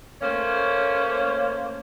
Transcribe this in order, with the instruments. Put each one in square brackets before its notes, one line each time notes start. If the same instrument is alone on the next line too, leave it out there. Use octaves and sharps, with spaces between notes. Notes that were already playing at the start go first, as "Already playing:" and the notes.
[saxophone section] A3 A#3 C#4 C5 C#5